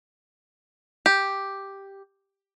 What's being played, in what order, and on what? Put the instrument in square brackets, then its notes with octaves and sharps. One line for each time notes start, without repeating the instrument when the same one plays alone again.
[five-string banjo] G4